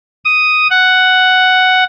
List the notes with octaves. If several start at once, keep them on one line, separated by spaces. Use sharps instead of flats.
D#6
F#5